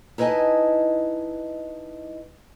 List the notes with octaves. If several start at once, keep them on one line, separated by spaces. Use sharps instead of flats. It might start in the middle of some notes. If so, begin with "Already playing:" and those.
D#4 E4 B4 D#5 G#5 A5